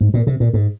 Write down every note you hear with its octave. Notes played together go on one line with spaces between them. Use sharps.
G#2
A#2
C3
A#2
G#2